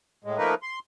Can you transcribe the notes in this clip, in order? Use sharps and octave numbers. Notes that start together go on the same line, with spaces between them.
A2 G#3
F3 A3 A#3 D#4 A#4 B4
C6